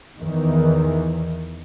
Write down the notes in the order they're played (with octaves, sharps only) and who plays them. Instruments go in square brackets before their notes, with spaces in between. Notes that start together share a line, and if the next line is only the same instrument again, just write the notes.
[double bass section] E2 D#3 E3